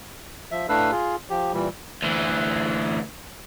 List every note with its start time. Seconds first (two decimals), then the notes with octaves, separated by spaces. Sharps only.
0.51 F3 E5
0.69 A2 A3 D4 B4 F5 E6
0.92 F4 G#4
1.30 F3 G4
1.54 A#2 E3 G3
2.02 D2 E3